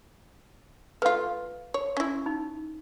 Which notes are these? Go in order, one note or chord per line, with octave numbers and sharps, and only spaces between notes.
A3 F4 B4 F5
C#5
C#4 E4
D#4